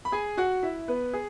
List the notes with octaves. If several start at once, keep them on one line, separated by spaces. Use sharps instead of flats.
B5
G#4 G#5
F#4 F#5
E4 E5
B3 B4
G#4